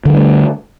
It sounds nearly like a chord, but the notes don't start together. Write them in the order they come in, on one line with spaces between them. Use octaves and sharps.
D3 F#3 G3 A3